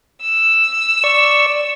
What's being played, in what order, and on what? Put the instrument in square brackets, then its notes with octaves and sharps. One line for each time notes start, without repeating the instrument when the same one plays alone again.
[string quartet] E6
[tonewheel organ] D5 C#6